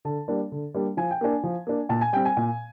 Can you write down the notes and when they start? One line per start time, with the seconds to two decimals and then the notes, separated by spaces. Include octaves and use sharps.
0.05 D3 A5
0.28 G3 A#3 D4
0.52 D3
0.75 G3 A#3 D4
0.97 F3 G#5
1.11 G5
1.21 A#3 D4 G#5
1.44 F3
1.67 A#3 D4
1.89 A#2 A5
2.01 G#5
2.13 G3 C4 G5
2.25 G#5
2.37 A#2